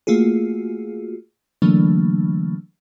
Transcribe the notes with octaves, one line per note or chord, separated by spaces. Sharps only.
A3 A#3 F4 F#4 G#4
D3 E3 F#3 A3 A#3 D4